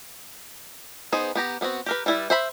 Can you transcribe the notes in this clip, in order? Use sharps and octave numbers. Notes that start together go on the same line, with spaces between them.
B3 D#4 G#4 C5
B3 G4 A#5
G3 B3 C4 F#4
G4 A#4 B4
G3 D4 E4 B4 D5
C5 E5 B5